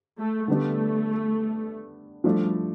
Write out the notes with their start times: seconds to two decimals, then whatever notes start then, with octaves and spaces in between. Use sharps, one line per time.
0.19 A3
0.48 D3 G3 A3 B3 D4
2.24 F3 G3 A3 D4